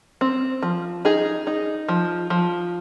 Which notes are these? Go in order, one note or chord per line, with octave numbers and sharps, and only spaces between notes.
C4
F3
D#4 G#4
D#4
F3
F3